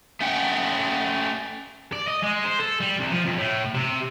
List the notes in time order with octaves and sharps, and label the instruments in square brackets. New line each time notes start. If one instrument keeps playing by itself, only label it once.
[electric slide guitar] A3 C#4 F#5 G5
[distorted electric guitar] D5
D#5
G#3
C5
A4
G3
C2
F3
F2
A2
C3